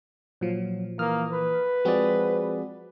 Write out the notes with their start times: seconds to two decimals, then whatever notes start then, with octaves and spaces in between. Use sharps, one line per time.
0.41 A#2 F3 F#3
0.99 E3 A#3 D#6 F6
1.33 B4
1.85 F3 G#3 C4 F#4 G#4 D5